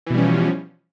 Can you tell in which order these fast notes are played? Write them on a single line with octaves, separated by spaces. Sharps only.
E3 B2 G3 C#4 F3